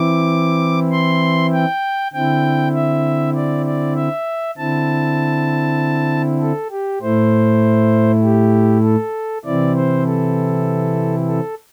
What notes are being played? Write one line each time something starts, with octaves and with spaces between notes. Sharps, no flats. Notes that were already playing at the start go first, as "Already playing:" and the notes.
Already playing: E3 C4 E4 D6
C6
G5
D3 C4 E4 G5
E5
D5
D5
E5
D3 C4 E4 A5
A4
G4
A2 A3 E4 C5
G4
A4
C3 E3 C4 E4 D5
C5
A4
A4